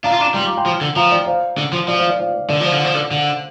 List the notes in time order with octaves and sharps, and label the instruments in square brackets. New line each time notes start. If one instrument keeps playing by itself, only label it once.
[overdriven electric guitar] D4 [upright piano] F5 A#5
[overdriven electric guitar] F4
[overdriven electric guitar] D4 [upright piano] A#5 D6
[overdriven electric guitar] G3 [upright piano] C6
[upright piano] D6
G5 C6
[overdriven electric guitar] F3
D3
[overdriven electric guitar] F3 [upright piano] F5 A#5
[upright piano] D5 G5
C5 F5
[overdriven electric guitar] D3
F3
[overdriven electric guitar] F3 [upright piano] D5
[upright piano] C5 F5
D5
C5 F5
D5
[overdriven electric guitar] D3 [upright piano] D5
[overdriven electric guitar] F3 [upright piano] C5 F5
[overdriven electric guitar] D3
[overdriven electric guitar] F3 [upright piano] D5
[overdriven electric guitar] D3 [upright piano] D5
[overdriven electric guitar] D3